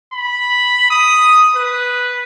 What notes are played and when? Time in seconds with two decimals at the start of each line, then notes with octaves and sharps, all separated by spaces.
0.13 B5
0.91 D#6
1.55 B4